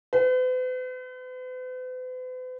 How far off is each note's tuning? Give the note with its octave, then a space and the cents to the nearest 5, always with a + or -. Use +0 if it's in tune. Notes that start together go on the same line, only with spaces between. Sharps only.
B4 +45